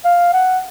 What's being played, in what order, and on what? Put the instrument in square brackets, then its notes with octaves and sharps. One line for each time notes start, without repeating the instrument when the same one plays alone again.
[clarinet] F5
F#5